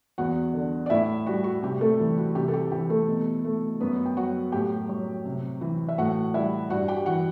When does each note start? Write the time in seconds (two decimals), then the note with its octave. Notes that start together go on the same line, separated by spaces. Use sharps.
0.18 E2 F#4 F#5
0.54 D3
0.86 D5
0.90 A2 E4 E5
1.26 G3 F#4
1.44 F#4
1.62 C3 G4
1.81 A3 A4
1.99 E3
2.18 F#4
2.35 C3 G4
2.48 A4
2.54 G4
2.71 E3 G4
2.90 A3 A4
3.08 B2
3.45 A3
3.80 F#2 B3 B4
4.06 G5
4.17 F#3 F#4 F#5
4.52 A2 G4 G5
4.89 F#3
5.25 C3
5.61 E3
5.88 E5
5.98 A2 F#4 F#5
6.34 G3 E4 E5
6.70 G2 F#4 F#5
6.88 G4 G5
7.06 E3 F#4 F#5